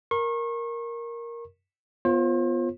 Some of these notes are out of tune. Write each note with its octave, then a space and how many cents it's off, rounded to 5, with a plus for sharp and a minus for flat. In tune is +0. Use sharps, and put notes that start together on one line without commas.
A#4 +0 C#6 -35
B3 +0 F4 +0 C5 +40